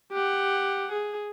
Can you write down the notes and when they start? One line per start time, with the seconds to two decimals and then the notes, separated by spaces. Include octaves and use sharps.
0.12 G4 F#5
0.92 G#4